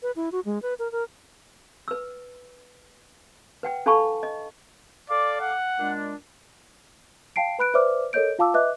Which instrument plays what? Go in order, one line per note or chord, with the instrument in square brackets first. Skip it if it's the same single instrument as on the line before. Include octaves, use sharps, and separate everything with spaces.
[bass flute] B4
E4
F#4
G#3
B4
A#4
A#4
[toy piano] B4 E6
B4 F#5 G5
D4 A4 F5 A5 B5 C#6
D#5
[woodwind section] A4 F5 D6 [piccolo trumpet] D5
[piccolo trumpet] F#5
[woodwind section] A#2 G#3 D4
[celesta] F5 G5 A5 C7 D7
B4 B5 F#6 D7
B4 C5 D5 E5 D6 F6
A4 A#4 C#5 D#5 G6 D7
F4 F5 A5 D6 E6
B4 D#5 E5 D6 F#6